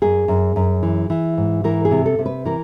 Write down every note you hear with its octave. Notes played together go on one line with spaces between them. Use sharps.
F#2 G#4
F#2
F#2
E3
E3
G#2
E3 A#4
G#4
C3
A4
C3
B4
E3 A#4